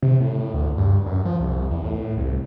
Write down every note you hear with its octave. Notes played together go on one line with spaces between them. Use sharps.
C3
A2
D2
G2
F#2
F3
C2
C2
E2
A2
C2